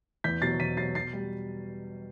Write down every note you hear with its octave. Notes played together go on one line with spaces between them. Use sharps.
E2 G6 B6
B2 F#3 A6 C7
E2 B6 D#7
B2 F#3 A6 C7
B2 A6 C7
G3